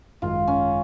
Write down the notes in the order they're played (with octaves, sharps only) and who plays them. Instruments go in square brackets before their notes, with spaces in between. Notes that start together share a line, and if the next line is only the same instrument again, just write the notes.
[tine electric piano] G#1 F#2 D#3 G#3 [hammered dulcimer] F4
[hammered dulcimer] C#4